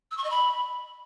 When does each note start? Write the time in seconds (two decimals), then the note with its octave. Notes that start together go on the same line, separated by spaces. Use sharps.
0.11 E6
0.18 C#6
0.24 D#5
0.30 B5